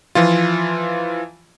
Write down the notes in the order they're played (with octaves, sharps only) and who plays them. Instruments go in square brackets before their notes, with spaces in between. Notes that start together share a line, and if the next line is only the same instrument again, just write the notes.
[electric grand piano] E3 F3 F4